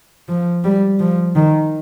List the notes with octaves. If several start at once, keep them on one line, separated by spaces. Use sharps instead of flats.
F3
G3
F3
D#3